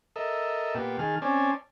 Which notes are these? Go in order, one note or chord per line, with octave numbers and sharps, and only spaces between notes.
A4 A#4 D#5 E5
A#2 B3 G4
D#3 G#4 A5 F6
C4 C#4 D5 G#5 A5